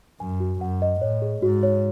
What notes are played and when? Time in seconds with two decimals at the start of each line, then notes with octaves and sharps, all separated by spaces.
0.20 F#2 G#5
0.40 F#4
0.61 F#2 F#5
0.82 D#5
1.01 A2 C#5
1.22 G#4
1.42 G#2 F#4
1.63 C#5